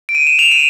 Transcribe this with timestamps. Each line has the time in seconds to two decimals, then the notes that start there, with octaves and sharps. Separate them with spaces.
0.09 D7
0.15 D#7
0.27 E7
0.39 F7
0.52 D#7